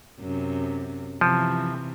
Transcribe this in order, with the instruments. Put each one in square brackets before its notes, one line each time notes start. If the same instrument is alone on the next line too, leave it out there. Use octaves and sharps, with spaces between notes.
[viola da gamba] F#2 C3
[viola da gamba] C3 E3 [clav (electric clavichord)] F3